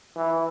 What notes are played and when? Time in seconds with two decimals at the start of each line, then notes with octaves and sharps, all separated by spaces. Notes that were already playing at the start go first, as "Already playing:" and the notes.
0.16 E3